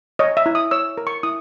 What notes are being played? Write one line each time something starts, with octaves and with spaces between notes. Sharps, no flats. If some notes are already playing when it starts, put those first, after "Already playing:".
C#5 D#5
E5
E4
D#6
C#5 E6
A#4
C#6
E4 D#6